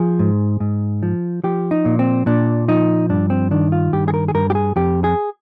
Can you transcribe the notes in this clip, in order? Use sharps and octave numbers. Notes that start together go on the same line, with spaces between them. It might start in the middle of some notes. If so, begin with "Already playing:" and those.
Already playing: F3 G#4
G#2
G#2
F3
F3 G4
D#4
A#2
C4
A#2 D4
F3 D#4
G2 D4
C4
D#3 D4
F4
G2 G4
G#4
A#4
G#4
G2 A#4
G4
G#4
F2 G4
G#4